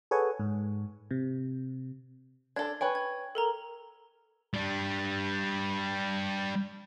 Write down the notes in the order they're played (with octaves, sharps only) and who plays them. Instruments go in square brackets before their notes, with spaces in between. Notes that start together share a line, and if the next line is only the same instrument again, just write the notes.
[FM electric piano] G#4 A4 B4 C#5 F#5 G#5
G#2
C3
[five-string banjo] D4 A4 [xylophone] G#6
[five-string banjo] B4 C#5 G#5 [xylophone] G5
[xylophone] G#6
A4 A#4 A#5
[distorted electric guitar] G3 D4